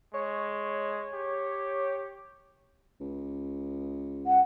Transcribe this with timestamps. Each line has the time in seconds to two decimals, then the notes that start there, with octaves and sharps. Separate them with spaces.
0.14 G#3 C#5
1.14 G4
3.00 C#2
4.27 F#5